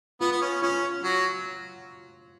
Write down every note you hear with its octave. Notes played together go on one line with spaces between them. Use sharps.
B3 F4
B3
C#4
C#4 F4
F#3 F#4